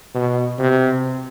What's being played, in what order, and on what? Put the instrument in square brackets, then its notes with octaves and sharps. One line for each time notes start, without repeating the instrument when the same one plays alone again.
[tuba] B2
C3